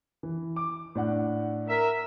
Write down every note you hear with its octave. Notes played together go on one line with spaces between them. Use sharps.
E3
D6
A2 D4 F#5
A#4 E5